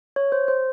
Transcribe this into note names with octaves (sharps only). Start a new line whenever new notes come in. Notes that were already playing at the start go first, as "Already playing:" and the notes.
C#5
C5
C5